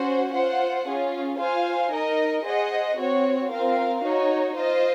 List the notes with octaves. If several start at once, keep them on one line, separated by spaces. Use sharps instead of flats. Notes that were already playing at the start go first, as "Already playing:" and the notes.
Already playing: C#4 F#4 C5 F#5
F4 C5 F#5
C#4 F4 G#4
F4 C5 F5 G#5
D#4 A#4 D#5
G#4 C5 D#5 F#5
C4 F#4 C#5
C4 F4 A#4 F5
D#4 F#4 C#5
F4 C5 D#5